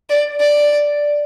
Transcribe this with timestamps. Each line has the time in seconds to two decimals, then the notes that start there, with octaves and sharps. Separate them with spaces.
0.10 D5
0.40 D5